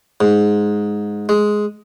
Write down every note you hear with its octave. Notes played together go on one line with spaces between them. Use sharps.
G#2
G#3